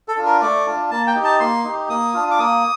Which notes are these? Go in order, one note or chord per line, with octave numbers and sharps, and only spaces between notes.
A4
D4 F4
A#4
A3 D5
D4 F4
A#3 A5
G5
D#4 G4
A5
A#3 C6
D#4 G4
A#3 D#6
D4 F4
D6
A#3 D#6